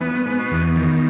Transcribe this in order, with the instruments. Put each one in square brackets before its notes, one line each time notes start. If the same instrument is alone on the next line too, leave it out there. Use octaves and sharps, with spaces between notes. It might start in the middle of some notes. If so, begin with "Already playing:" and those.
[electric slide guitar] E2 [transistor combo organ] B3
[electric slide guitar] G2
[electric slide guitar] G#2 [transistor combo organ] B3
[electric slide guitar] B2
[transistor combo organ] E2
D#3